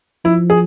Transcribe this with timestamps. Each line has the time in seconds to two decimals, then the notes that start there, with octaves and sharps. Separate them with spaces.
0.25 F3 E4
0.50 G#4